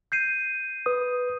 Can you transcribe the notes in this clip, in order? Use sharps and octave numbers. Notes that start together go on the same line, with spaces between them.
G6 C7 D#7
B4 D#6